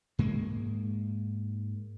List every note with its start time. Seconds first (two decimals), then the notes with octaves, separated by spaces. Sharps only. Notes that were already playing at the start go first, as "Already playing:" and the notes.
0.19 G#2 G#3 A#3